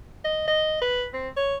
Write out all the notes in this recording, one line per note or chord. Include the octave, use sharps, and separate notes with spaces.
D#5
D#5
B4
C4
C#5